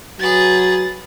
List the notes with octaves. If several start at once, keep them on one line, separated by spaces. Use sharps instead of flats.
F#3 G#4 B4 A6